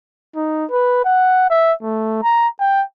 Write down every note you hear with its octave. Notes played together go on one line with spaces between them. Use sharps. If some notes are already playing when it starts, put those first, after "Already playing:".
D#4
B4
F#5
E5
A3
A#5
G5